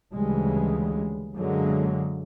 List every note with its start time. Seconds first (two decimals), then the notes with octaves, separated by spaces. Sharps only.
0.13 D2 C#3 E3 G3 G#3
1.35 F#2 D3 F#3 G#3 A#3